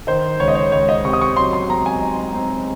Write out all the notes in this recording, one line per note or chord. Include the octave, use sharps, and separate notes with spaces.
D#3 C5
C#2 C#5
D#5
C#5
C#2 C#5
D#5
C3 C#6
D#6
C#6
F#3 C6
C6
C4 A#5
G#5
D#4
C4